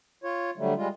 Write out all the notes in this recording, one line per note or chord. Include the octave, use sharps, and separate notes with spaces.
F4 C#5
D3 F#3 G3 A3
G3 G#3 F4